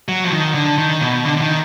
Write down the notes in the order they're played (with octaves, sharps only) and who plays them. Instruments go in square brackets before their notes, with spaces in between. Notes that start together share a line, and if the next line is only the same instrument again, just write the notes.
[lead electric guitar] F#3
F3
D#3
D3
D#3
B2
D3
D3
D#3